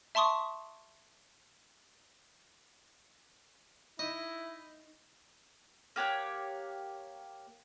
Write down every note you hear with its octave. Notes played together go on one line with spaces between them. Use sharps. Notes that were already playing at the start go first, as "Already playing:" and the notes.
E5 A5 C6 C#6 D#6
D#4 E4 D#5
A#3 G4 C#5 F#6